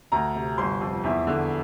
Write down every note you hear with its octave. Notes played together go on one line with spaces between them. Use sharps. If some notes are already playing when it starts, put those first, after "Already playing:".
D2 A#5
C3
G1 C6
F2
E2 E5
D3